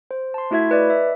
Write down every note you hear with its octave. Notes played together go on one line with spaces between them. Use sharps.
C5
A5 C6
A3 E4 F#4 E5 G#6
B4 D5 D#5
E5